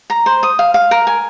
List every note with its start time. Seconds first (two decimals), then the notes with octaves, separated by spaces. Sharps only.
0.10 A#5
0.26 C5
0.43 D#6
0.59 F5
0.74 F5
0.91 A#4
1.07 G#5